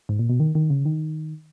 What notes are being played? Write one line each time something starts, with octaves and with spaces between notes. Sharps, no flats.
G#2
A#2
B2
D#3
D#3
C#3
D#3